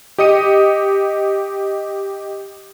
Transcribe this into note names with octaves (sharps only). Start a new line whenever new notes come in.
G4 D#5 D#6 C#7 D#7